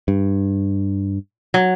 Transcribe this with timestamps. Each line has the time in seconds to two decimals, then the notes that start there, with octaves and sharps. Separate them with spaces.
0.08 G2
1.54 F#3